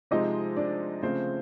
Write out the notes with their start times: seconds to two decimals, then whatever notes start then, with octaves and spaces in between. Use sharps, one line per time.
0.11 C3 F3 G#3 C4 D#4 D#5
0.57 D4 D5
1.02 C#3 F3 A3 C4 C5